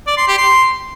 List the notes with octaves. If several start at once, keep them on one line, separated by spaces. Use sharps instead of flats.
D5
C6
G4
C6